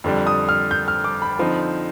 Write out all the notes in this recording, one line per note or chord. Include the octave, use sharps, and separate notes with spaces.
F2 D3 G3
D#6
F6
G6
F6
D6
B5
D3 F3 C4 D#4